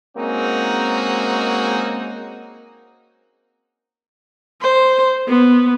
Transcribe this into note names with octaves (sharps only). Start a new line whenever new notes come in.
G#3 A#3 C4 C#4 D#4 F#4
C5
B3